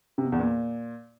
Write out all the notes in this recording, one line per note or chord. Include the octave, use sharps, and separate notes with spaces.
C3
B2
E2
A#2